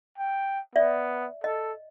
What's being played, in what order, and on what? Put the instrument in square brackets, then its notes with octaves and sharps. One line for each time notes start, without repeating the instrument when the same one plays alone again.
[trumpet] G5
[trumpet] B3 [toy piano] D5 E5
[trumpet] A4 [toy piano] D#5